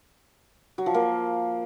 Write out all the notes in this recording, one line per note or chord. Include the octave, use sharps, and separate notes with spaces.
F#3
F3
A#3